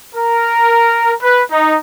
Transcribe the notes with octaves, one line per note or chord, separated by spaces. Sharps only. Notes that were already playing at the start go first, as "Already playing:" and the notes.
A#4
B4
D#4